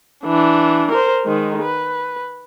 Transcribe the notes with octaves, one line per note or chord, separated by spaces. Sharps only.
E3 D4
A#4 C5
D#3 G#3
B4